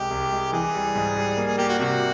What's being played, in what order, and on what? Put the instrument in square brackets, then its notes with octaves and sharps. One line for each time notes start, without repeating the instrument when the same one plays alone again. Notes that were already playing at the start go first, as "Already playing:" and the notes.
Already playing: [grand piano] C2 G#3 [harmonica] G4
[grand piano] C2
G#3
[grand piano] E3 [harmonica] G#4
[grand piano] G3
G#2
G3
A#3
[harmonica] G#4
[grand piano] A#3 [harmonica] G4
[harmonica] F#4
[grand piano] C3 [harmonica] F#4